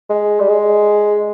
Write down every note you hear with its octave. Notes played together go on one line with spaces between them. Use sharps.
G#3
G3
G#3